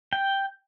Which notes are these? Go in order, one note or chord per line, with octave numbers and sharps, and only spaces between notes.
G5